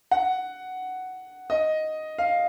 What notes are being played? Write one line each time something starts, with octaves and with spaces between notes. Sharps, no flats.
F#5
D#5
F5